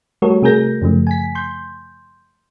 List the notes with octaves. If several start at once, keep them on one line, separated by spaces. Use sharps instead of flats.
G3 A3 F#4 A4 A#4 C#5
C3 A3 G#4 A#4 G6 A#6
F#2 C#3 F3 A3
G#5 B6
C6 G6